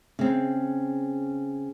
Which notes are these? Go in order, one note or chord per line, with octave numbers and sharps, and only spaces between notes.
C#3 C4